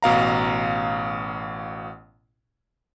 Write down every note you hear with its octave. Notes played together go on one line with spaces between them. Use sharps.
A1 B2 F5 A#5